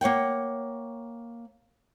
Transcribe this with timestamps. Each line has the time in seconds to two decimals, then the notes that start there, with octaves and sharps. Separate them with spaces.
0.01 A#3 C#5 F#5 G5